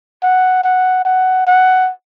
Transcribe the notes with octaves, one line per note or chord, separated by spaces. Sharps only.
F#5
F#5
F#5
F#5